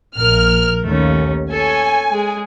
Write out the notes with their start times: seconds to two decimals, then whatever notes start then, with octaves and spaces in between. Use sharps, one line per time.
0.17 A#1 A#4 F6
0.85 D#2 A3 C#4
1.51 A4 C#5 G#5
2.11 G#3 G#4